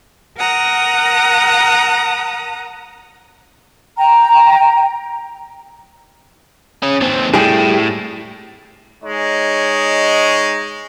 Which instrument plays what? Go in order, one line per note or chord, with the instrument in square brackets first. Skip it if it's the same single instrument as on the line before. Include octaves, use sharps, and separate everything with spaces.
[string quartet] A#4 F#5 A#5 D#6 F#6
[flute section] G5 A#5
[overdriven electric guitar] C#4 G#4
D#2 C4
[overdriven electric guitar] A2 [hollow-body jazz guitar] G3 G4 G#4
[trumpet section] G#3 D#4 C#5